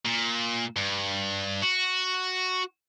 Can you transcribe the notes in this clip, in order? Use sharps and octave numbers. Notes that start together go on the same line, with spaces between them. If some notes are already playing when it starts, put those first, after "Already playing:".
A#2
G2
F#4